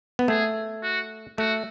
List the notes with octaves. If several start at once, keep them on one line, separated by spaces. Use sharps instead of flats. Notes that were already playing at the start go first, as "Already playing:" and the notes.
B3
A3 G#4
F#4
A3 F#4